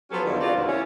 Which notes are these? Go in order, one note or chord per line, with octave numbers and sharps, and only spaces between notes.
F3 F#3 B3 C#4 G4 A4
E2 D3 D#3 F3 G3
C4 F4 F#4 D5
D#2 A#2 A#3
C#4 E4